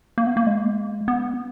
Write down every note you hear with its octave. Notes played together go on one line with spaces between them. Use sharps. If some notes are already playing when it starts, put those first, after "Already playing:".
A#3
B3
A#3
G#3
B3